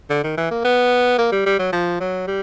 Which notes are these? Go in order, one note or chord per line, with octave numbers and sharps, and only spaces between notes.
D3
D#3
E3
A#3
B3
A#3
G3
G3
F#3
F3
F#3
G3